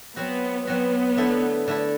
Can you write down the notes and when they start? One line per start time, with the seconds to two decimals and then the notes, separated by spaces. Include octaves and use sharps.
0.16 F#3 B3 C4 F#4
0.67 F#3 B3 C4 F#4
1.17 D3 A3 E4 A4
1.68 D3 A3 E4 A4